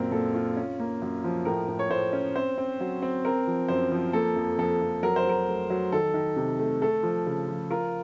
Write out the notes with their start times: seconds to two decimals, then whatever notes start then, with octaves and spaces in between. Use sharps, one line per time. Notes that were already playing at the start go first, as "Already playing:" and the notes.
Already playing: F#2 A#2 C4 A#4
0.11 A#2 A4
0.34 F4
0.57 C#4
0.80 A#3
1.02 F#2
1.24 F3
1.45 A2 A#4
1.68 A2
1.79 C#5
1.90 A2 C5
2.13 C#4
2.35 C4 C5
2.58 C4
2.80 F#3
3.02 C4
3.25 C4 A#4
3.47 F3
3.68 F#2 C5
3.92 F3
4.13 A#3 A4
4.36 F2
4.58 F2 A4
4.81 F2
5.03 F#3 A#4
5.16 C5
5.25 F#3 A#4
5.48 A3
5.70 F#3
5.92 D#3 A4
6.14 D#3
6.36 C3
6.59 A3
6.82 A3 A4
7.03 F3
7.27 C#3
7.48 F3
7.71 F4 A#4